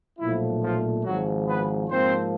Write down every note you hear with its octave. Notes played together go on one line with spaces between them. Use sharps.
B1 A#2 F3 A3 E4
F3 F4
G#1 G#2 F3 F#3 F#4
B3 B4
G#2 F3 A#3 C4 C5